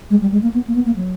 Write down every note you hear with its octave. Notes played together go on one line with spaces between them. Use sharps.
G#3
G3
G#3
A#3
B3
A#3
B3
A#3
F#3